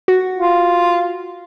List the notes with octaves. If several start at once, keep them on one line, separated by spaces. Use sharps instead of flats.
F#4
F4